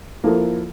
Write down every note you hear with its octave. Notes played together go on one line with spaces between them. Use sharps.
F3 A#3 E4 A4